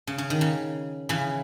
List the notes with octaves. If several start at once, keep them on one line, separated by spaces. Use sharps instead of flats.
C#3
C#3
D#3
C#3
C#3 E3